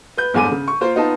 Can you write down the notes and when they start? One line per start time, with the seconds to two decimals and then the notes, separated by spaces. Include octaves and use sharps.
0.17 B4 G6
0.34 G1 E2 G#2 G#5 D6 D#7
0.51 C#3
0.68 C#6
0.81 A#3 F4 A#4 C5
0.95 B3 D#4 F4 D#5 A5